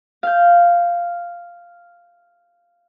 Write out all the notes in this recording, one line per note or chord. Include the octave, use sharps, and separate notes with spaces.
F5 G6